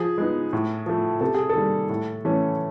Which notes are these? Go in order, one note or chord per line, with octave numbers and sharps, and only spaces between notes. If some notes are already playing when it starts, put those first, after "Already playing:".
Already playing: F3 G#4
G#3 B3 D#4
A2
F3 A3
C3 A4
G#4
A4
D#3 G3 A#3
A2
E3 A3 C#4